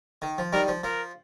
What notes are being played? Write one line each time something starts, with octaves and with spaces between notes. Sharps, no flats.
D#3
F3
D#3 G3 A#4
F3
F3 A#4